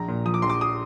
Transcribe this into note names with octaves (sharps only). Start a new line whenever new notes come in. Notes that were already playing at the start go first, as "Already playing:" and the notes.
Already playing: A#1 A#5
A#2
F3 D#6
D6
A#1 C6
D6
D#6